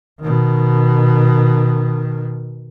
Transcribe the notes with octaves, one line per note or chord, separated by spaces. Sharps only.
B2 D#3